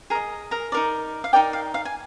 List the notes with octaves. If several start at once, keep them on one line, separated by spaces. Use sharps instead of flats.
G#4 A#4 D#5 A#5
A#4 A#5
D#4 A#4 D5
F5
D#4 G4 A#4 D5 G5
F5
F5
G#5